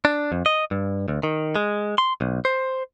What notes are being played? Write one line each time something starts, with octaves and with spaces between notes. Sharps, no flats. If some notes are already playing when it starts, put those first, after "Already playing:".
D4
F2
D#5
G2
D2
D#3
G#3
C6
B1
C5